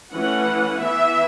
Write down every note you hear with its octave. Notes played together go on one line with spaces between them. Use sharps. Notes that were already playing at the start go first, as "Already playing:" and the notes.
E3 A3 C#4 F#5
E3 B3 E5